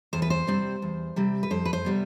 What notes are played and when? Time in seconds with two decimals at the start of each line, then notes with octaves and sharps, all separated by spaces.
0.13 E2 C5
0.22 B4
0.30 C5
0.47 C3 G3 C4
0.82 E2
1.16 C3 G3 C4
1.43 B4
1.51 F2 C5
1.65 B4
1.73 C5
1.85 C3 G3 B3